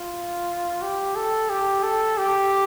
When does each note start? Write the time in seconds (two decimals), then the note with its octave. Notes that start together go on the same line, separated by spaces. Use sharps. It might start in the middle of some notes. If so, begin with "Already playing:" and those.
Already playing: F4
0.82 G4
1.16 A4
1.50 G4
1.83 A4
2.18 G4